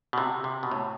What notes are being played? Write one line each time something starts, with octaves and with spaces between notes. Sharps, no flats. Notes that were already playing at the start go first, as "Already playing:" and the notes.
B2
C3
C3
B2
A2